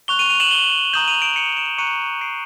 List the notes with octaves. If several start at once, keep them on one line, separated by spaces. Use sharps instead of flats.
C#6 F#6 F7 G7
D#7 F7
D#7 F7
E7 F#7
F7 G7
A#5 D#6 G6 E7 F#7
D#7 F7
D7 E7
C#7 D#7
D7 E7
A#5 C#6 F#6 C#7 D#7
C7 D7